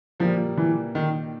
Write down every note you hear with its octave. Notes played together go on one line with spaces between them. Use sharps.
A#2 F3 G3 A#3
E3
D#3